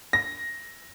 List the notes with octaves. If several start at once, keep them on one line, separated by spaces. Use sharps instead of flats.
A#6